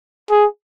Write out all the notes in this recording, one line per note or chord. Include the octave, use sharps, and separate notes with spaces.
G#4